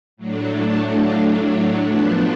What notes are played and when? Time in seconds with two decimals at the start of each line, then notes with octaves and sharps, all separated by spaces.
0.17 A2 F#3 A3 D4
0.59 A5
1.02 F5
1.43 C#5
1.85 F#2 F3 B3 D4 B4